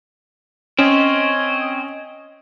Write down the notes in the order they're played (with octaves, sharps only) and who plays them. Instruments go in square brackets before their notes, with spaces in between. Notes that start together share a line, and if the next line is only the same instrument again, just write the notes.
[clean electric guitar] C4 [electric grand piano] C#4 [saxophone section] C#5 D#5